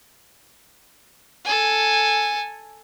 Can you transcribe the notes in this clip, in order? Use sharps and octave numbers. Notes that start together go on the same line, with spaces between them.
A4 G#5